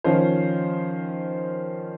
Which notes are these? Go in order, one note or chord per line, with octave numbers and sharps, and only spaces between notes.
D#3 F3 C#4 F4 C5